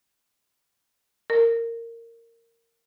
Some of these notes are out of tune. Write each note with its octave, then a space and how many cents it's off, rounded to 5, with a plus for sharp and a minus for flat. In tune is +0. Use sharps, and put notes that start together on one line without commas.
A#4 -15